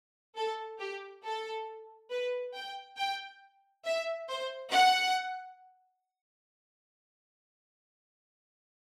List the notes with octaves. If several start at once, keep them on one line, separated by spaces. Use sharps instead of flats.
A4
G4
A4
B4
G5
G5
E5
C5
F#5